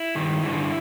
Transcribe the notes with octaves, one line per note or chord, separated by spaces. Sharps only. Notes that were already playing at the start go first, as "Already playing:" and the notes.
Already playing: E4
G2 D#3
G2 D3 E4